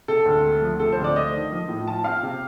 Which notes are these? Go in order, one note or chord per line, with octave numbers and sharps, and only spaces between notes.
C3 A4
D2
A3
F3
C3 A4
C5
D2
D5
A3 D#5
D#3
F3
A2
F4 A5
C4 F5
C3